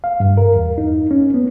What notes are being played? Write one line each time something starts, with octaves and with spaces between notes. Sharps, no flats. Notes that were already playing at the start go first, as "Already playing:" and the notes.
F5
G2
A#4
E2
D#4
C#4
B3